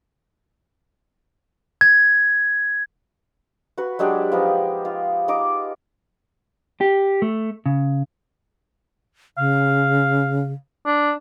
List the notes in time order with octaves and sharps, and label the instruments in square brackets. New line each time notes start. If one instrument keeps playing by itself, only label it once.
[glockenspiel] G#6
[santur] F#4 B4
F#3 G#3 D4 G4
F3 B3 D#4
F4
D#4 D6
[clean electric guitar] G4
A3
C#3
[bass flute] C#3 [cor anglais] F5
[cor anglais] D4